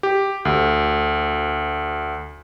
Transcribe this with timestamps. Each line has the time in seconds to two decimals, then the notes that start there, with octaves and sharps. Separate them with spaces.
0.03 G4
0.45 D2